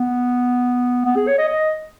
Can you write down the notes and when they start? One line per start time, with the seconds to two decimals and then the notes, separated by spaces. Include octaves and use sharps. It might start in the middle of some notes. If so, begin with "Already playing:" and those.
Already playing: B3
1.05 B3
1.16 G#4
1.27 C#5
1.38 D#5
1.48 D#5